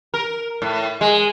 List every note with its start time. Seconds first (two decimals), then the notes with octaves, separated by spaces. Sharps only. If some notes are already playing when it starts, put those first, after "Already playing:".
0.14 A#4
0.62 A2
1.01 G#3